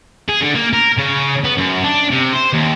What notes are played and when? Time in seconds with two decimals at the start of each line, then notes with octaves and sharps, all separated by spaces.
0.28 G#4
0.41 D3
0.55 A#3
0.73 A#4
0.98 C#3
1.44 B3
1.58 F#2
1.84 D4
2.11 C3
2.33 C5
2.54 D#2